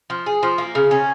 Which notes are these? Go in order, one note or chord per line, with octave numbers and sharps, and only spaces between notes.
F3
G#4
F3
A#3
C#3
C#4